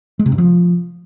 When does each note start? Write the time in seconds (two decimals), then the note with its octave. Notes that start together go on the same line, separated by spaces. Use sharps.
0.19 G#3
0.26 C3
0.32 G2
0.38 F3